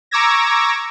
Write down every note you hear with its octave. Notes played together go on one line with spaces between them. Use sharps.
A#5 C#6 D6 E6 G#6 A#6